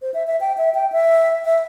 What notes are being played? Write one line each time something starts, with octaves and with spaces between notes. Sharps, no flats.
C5
E5
E5
G5
E5
G5
E5
E5